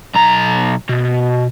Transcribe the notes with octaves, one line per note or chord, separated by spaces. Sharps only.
B1 A#5
B2